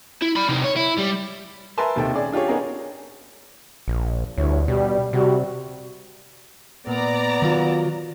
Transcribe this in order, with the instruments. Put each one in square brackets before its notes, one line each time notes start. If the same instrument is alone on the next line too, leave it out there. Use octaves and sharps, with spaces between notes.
[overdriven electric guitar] E4
D5 B5
C3 D#4
C#5
E4
G3
[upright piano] A#4 B4 E5 G#5 A5 C6
D#2 C3 D#3 A4 E5 G5
C#4 G#4 D5
D4 F4 G4 G#4 C#5
B3 C#4 D#4 G#4 A#4 C#5
[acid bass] A#1
[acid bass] D2 [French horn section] G2 E4 C#5
[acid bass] B2 [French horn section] G3
[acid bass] C3 [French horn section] G3 F#4
[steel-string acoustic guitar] A#2 [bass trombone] B3 [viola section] D5 A#5
[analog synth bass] D#3 [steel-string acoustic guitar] F#3 F4